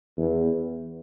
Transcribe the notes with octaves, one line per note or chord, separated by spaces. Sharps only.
E2